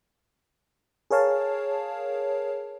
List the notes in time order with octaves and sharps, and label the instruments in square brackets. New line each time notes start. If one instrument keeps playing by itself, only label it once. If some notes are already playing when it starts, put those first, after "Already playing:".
[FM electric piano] G#4 A#4 C#5 F5 A5